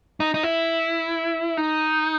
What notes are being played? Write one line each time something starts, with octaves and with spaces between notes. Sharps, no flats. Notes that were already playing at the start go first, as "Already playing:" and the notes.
D#4
D#4
E4
D#4